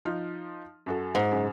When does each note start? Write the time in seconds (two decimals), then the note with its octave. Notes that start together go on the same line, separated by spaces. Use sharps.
0.05 F3 D#4 F6
0.86 F#2 F#4 A4
1.15 G#2
1.31 F#2 C#3